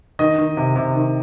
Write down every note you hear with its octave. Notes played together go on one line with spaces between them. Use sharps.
D#3 D#5
D#3
C3
C3
D#3